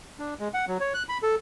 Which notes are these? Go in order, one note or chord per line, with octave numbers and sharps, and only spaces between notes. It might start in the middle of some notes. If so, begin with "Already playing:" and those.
D4
G#3
F#5
F#3
C#5
F#6
B5
A4